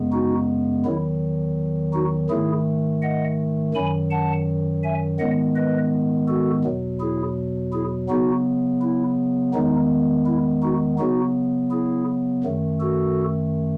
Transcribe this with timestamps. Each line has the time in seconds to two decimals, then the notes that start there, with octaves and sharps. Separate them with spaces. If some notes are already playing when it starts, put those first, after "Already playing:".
Already playing: F#2 C#3 G#3 B3
0.12 D#4 F#4
0.85 E2 D#3 F#3 E4
1.94 D#4 F#4
2.30 G#2 D#3 A3 E4 G#4
3.02 D#5 F#5
3.74 F#2 D#3 F#3 G#5 B5
4.11 F#5 A5
4.83 E5 G#5
5.19 G#2 D#3 G#3 B3 D#5 F#5
5.56 B4 D#5
6.28 F#4 A4
6.64 E2 B2 F#3
7.00 E4 G#4
7.73 E4 G#4
8.09 C#3 F#3 B3 D#4 F#4
8.82 E4
9.54 E2 D#3 G#3 B3 D#4
10.26 E4
10.63 D#4 F#4
10.98 C#3 F#3 B3 D#4 F#4
11.71 E4 G#4
12.44 F#2 D#3 A3
12.80 F#4 A4